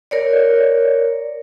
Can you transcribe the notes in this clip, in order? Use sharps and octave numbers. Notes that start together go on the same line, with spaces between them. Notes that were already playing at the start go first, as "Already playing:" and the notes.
A#4 C#5 D5